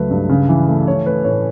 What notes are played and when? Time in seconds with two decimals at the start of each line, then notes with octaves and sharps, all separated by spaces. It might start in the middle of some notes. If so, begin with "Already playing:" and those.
Already playing: C#2 F#3 A3 B4
0.10 G2
0.29 C#3
0.48 E3
0.69 A3
0.88 E3 C#5
1.06 A3 B4
1.24 A2 C#5